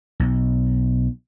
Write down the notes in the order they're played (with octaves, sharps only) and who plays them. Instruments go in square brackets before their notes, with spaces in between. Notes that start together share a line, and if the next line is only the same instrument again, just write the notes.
[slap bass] B1